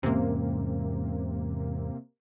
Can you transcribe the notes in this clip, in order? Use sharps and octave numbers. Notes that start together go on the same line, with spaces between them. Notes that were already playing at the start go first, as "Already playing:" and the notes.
E2 G#2 C3 A#3 C#4